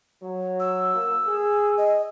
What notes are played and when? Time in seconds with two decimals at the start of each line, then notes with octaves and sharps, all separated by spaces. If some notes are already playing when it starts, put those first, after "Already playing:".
0.22 F#3
0.60 E6
0.95 A#3
1.26 G#4
1.78 D#5